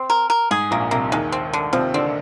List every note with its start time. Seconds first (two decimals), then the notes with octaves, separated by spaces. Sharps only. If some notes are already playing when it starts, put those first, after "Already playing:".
Already playing: C4
0.10 A#4
0.30 A#4
0.51 G#2 G#4
0.71 A#1 A#2 A#3
0.91 C2 C3 A#3
1.12 D#2 D#3 G#3
1.32 C4
1.53 D3
1.73 C3 F3 C4
1.94 D3 C4 D4